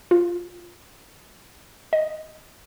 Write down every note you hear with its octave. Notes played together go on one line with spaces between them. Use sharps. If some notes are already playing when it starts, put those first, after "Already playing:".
F4
D#5